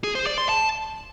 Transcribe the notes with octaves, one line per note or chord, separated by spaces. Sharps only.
G#4
C5
D5
C6
A5